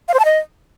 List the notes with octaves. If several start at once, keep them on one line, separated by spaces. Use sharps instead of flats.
F5
C5
A5
D#5